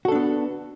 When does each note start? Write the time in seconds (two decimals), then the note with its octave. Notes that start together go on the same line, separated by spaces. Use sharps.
0.05 F#4
0.08 A4
0.12 D4
0.15 B3